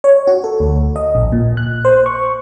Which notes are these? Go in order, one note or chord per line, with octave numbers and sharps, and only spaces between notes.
C#5
F#4
A4
D2
D#5
A#1
A#2
F#6
C5
C#6